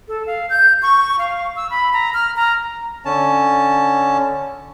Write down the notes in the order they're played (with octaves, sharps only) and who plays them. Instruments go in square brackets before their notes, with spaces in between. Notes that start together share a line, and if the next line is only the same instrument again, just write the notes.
[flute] A4
F5
G6
C#6
F5
E6
B5
A#5
F6
A#5
[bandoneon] D3 C#4 A5